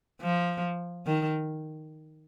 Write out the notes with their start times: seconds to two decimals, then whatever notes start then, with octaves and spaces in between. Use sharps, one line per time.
0.21 F3
1.06 D#3